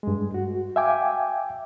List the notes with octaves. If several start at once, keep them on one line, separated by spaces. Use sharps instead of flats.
G2 G#3
F#4
E5 F5 G5 G#5 D6